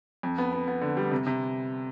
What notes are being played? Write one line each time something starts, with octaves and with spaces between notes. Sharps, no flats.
F2
B3
B3
B3
D3
G3
C3
C3